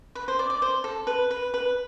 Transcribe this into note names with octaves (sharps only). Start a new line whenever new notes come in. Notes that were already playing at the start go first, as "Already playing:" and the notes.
B4
C5
D5
D5
C5
A4
B4
B4
B4